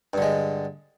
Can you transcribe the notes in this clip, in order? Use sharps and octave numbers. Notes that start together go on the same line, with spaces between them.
G2 D3 G#3